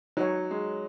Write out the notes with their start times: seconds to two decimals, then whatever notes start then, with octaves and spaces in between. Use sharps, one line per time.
0.17 F#3 D#4 F#4 C#5
0.51 G#3